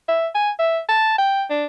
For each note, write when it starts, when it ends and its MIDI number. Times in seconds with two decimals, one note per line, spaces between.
0.09 0.27 76
0.35 0.50 80
0.59 0.79 76
0.89 1.17 81
1.18 1.45 79
1.50 1.65 62